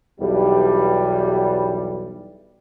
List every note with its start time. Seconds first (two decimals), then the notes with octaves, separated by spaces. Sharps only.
0.20 B1 E2 G3